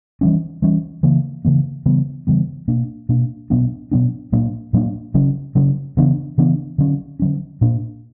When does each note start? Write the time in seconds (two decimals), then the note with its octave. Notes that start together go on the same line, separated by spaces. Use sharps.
0.21 E3 G3 C#4
0.62 E3 G3 C#4
1.03 C#3 E3 A#3
1.45 C#3 E3 A#3
1.86 C#3 E3 G3 B3
2.27 C#3 E3 G3 B3
2.68 B2 A#3 D4
3.09 B2 A#3 D4
3.50 B2 F#3 B3 D4
3.91 B2 F#3 B3 D4
4.32 A#2 F#3 A#3 D4
4.73 A#2 F#3 A#3 D4
5.14 C#3 F#3 C#4
5.55 C#3 F#3 C#4
5.97 C#3 E3 B3 D4
6.38 C#3 E3 B3 D4
6.78 D3 F#3 C#4
7.20 D3 F#3 C#4
7.61 A#2 A#3 D4